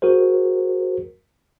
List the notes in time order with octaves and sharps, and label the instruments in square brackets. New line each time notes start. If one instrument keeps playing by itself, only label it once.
[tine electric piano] F#4 G#4 A#4 C5